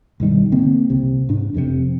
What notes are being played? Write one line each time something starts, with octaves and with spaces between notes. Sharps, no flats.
B1 G2 D#3 G3
D3 A#3 C4
C2 C3
G#2 D4
F1 F2 G#2 C3